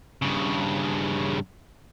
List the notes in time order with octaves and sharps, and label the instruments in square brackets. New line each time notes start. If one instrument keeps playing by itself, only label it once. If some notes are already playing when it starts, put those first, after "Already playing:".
[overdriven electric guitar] G2 C#3